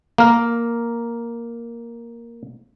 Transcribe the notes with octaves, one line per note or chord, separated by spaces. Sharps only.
A#3 A#4